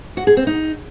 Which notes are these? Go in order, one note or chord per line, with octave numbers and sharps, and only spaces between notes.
F#4
G#4
C4
D#4